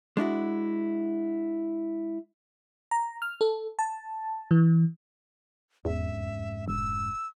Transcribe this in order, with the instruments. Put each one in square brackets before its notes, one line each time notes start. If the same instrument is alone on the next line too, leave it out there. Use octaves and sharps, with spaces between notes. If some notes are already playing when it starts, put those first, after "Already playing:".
[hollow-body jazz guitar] G#3 D4 E4 F#4
[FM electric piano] A#5
F6
A4
A5
E3
[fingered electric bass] F1 G#2 C#4 [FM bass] E2 [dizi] E5
[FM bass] E1 [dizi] E6